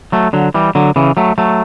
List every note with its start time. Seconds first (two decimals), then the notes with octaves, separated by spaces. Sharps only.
0.12 F#3 A3
0.33 D3 F#3
0.54 E3 G3
0.75 D3 F#3
0.96 C#3 E3
1.17 F#3 A3
1.38 F#3 A3